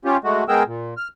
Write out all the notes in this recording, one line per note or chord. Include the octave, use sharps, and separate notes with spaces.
C#4 F4 G4
G#3 A3 F#4
G#3 B3 G#4 A#4 G5 E6
A#2
F6